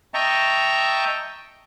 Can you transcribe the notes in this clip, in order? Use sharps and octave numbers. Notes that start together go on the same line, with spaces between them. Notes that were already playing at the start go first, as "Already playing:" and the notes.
D#5 E5 G5 A5 A#5 C#6